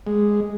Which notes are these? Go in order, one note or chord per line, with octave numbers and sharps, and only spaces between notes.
G#3